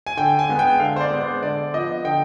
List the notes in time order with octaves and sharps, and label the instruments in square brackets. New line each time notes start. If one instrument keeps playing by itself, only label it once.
[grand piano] G#5
D3 G5
G#5
G#3 B3
G5
D3 F5
C5
D5
G#3 B3
C5
D3 D5
F3 B3 D#5
D3 G5